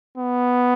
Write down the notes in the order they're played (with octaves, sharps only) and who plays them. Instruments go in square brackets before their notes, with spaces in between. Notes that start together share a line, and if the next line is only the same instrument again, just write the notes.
[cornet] B3